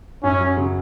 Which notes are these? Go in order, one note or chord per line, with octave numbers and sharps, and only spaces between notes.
F#2 C#4
F#3
C#3